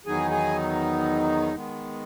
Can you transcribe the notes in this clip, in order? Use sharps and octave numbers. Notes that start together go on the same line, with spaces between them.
E2 D#3 F#3 B3 D#4 G#4 G#5
G#4 G#5
D#3 G#3 B3